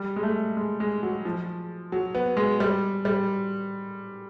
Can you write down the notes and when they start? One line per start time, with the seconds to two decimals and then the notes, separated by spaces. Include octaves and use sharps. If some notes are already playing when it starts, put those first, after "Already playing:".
Already playing: G3
0.16 G#3
0.23 A3
0.57 G#3
0.80 G#3
1.03 F#3
1.25 F3
1.92 F#3
2.15 B3
2.37 G#3
2.60 G3
3.05 G3